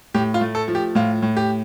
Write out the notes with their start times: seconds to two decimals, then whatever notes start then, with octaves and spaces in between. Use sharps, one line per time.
0.14 A2 G4
0.34 F4
0.41 A3
0.55 A4
0.68 F3
0.75 G4
0.95 A2 F4
1.22 A2
1.37 G4